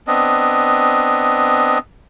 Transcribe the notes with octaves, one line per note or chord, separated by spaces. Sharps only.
B3 C4 D4 D#5